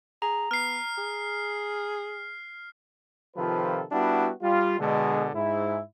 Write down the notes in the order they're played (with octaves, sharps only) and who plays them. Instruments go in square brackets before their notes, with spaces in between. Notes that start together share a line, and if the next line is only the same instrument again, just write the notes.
[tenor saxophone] G#4 [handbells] A#5
[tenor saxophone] B3 [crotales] F6 C7
[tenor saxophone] G#4
[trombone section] C3 D#3 F3 F4 A4 B4
G3 B3 D4 E4 F#4
G3 F4
B2 D3 G#3
G#2 E4